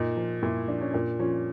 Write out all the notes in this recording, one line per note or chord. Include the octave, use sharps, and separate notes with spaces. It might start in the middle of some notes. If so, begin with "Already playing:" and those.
Already playing: A#2 D#4
F3
A#2 E4
F3 D4
C#4
A#2 D4
F3 C#4